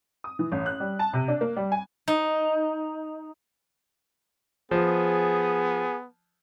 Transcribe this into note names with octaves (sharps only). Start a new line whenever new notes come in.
D#6
E3
A1
F#6
G3
A5
C3
D4
A#3
G3
G#5
D#4
F3 B3 G#4